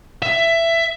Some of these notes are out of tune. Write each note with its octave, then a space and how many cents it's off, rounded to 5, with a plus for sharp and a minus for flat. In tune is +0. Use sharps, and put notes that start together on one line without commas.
E5 +15